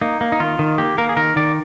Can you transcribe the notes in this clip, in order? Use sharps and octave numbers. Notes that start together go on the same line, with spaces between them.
A#3 D#4
A#3
D#4
D#3 F4
D#3
A#3 G4
A#3 A#4
G#4
D#3 A#4
D#3 D5